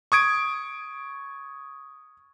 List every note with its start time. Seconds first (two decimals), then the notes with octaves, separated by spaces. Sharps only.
0.12 C#6 D#6 G#6 D7